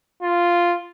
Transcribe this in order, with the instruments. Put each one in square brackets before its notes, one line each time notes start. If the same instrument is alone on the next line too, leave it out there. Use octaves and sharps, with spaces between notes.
[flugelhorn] F4